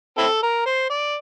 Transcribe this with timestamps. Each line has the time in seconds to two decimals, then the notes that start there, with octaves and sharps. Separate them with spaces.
0.18 C4 E4 A4
0.43 A#4
0.66 C5
0.90 D5